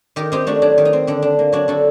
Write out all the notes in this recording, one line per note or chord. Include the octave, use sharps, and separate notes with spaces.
D#3 G4 A#4
C4 D#4 G4
A3 D4 F#4
F#3 D4
D#3
D#4
C4
D3 D4
D4
A#3
F#3 D4 F#4
D3 F#4 A4